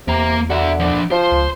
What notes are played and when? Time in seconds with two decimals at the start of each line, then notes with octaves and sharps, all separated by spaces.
0.08 E2 C3 A#3 A#5
0.50 D3 F#4 E5
0.80 F3 D4
1.11 F3 C5
1.32 C#2